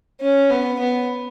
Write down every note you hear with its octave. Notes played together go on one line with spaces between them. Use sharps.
C#4
B3
B3